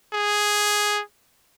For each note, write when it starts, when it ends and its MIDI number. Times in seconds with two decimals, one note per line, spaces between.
0.14 1.01 68